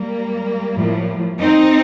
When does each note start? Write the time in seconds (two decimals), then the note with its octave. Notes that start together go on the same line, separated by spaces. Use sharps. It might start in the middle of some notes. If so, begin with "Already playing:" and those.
Already playing: G3 A#3
0.75 A2 F3
1.40 C4 D#4